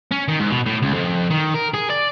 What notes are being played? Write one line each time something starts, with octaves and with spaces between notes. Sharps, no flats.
C#4
D#3
G#2
B2
A2
C#2
F2
D#3
A#4
G#4
D5